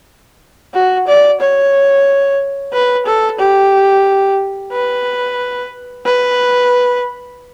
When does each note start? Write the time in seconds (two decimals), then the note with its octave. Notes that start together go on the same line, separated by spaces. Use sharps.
0.74 F#4
1.07 D5
1.40 C#5
2.73 B4
3.06 A4
3.39 G4
4.72 B4
6.05 B4